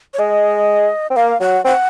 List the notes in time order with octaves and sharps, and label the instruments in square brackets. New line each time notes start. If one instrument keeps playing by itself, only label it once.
[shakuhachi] C#5
[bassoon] G#3 [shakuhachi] D#5
[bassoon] C4
[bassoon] A#3 [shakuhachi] F5
[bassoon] F#3 [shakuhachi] F#5
[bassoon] C4 [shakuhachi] F#5